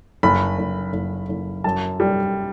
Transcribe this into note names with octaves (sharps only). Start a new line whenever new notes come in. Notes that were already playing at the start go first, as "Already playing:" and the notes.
F#1 B5
F#1
F#1
F#1
F#2 A5
G3